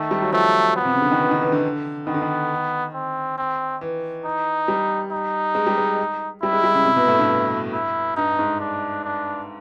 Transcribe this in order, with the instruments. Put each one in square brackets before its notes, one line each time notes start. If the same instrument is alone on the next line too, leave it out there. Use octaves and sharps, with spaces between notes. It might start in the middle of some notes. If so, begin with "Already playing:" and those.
Already playing: [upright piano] D#3 [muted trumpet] A3
[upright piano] G3
F#3
[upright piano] F3 [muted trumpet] A3
[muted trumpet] B3
[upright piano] C3
C#3
D3
D#3
E3
D#3
E3
D3
[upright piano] D#3 [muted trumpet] B3
[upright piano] D3
D#3
[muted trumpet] C4
C4
[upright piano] E3
[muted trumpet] D#4
[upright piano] G3
[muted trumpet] D#4
[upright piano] G#3
G3
G#3
[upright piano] G3 [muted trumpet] E4
[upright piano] G#3
G3
C#3
C3
B2
A2
G2
[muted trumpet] E4
[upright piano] G2 [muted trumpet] D#4
[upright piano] G#2
[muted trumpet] D4
D4